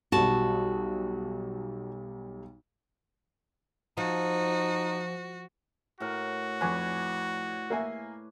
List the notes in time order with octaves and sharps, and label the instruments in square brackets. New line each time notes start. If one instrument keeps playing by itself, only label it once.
[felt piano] B1 G3 [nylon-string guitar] F#4 A5
[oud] F3 [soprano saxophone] D#4 [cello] F#4
[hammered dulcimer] A2 A#4 [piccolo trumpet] F#4
[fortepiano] F2 G#5 F#6 [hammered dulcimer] B4 C#5 D5
[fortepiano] A#3 E5 G#5